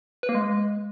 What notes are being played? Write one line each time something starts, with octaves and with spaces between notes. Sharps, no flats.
B4
A#3
G#3